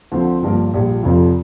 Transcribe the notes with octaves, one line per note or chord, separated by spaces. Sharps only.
D2 D3 F3 C4
G1 G2 F3 A#3
A#1 A#2 G3
F1 F2 F3